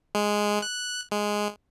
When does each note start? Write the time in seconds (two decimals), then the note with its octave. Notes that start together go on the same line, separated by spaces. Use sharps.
0.15 G#3
0.62 F#6
1.11 G#3